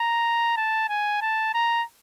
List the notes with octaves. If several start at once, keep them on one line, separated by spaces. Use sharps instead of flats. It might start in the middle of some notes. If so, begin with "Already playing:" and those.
Already playing: A#5
A5
G#5
A5
A#5